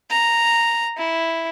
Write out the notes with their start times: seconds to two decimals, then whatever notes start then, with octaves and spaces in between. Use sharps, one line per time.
0.11 A#5
0.98 E4